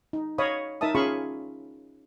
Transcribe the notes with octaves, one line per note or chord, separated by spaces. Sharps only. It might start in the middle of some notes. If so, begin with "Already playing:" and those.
D#4
C#5 D#5 F5 B5 D#6
D#4 A#4 E5 A5 D#6
C#4 F4 G#4 F5 B5 C#6